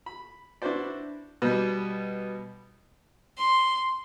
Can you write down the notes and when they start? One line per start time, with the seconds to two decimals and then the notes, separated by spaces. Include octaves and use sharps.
0.06 B5
0.62 D4 E4 F#4 B4 C5 D5
1.42 B2 G3
3.39 C6